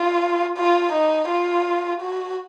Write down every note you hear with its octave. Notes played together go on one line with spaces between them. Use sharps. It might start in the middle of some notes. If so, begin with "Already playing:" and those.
Already playing: F4
F4
D#4
F4
F#4